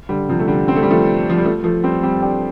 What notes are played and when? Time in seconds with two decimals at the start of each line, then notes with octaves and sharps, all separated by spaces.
0.09 D3 G3
0.29 C3 F3
0.39 A3
0.48 D3 G3
0.68 C4
0.76 A3
0.83 G3
0.91 F3 A3
1.30 F3
1.37 G3
1.45 F3 A3
1.64 F3 A3
1.84 G3 C4
2.03 G3 C4
2.22 D4 G4